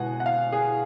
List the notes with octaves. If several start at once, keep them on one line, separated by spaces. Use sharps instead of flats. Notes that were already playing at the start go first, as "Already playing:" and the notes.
Already playing: B2 G#3 B3 F#5 G#5
F#5
F5
G#4